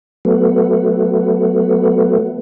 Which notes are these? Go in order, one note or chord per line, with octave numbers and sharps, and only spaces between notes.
F#3 A3 B3